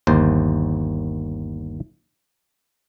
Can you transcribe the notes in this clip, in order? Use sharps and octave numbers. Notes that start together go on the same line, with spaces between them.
G1 D#2 C5